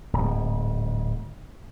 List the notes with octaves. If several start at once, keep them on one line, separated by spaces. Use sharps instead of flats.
D1 G#2